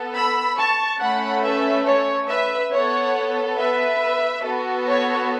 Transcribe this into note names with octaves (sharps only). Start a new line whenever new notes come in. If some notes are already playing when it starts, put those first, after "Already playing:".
Already playing: B3 A4
B5 E6
A5 C#6
A3 C#4 A4 F#5 B5
B4 E5
C#5
B4 E5
B3 A4 C#5 F#5
B4 E5
B3 F#4 A4
C#5